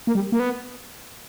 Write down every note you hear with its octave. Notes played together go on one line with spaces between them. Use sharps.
A#3
G3
A#3
B3